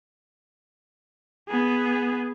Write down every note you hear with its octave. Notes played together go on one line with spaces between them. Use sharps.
B3 G#4